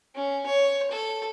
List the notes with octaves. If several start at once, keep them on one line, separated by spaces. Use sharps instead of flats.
C#4
C#5
A4